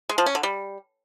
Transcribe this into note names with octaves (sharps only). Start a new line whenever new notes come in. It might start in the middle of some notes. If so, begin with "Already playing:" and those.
G#3
F3
C#4
D3
G3